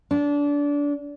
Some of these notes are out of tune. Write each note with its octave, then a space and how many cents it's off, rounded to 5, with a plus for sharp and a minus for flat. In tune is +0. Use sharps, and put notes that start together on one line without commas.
D4 -25